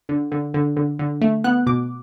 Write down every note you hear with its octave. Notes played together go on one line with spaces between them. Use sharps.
D3
D3
D3
D3
D3
A3
B3 F#6
B2 D6